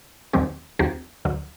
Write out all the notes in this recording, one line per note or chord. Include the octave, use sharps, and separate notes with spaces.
D#2 D#3 F#3 C4 G4
D#2 D#3 F#3 C4 G4
D2 D3 F#3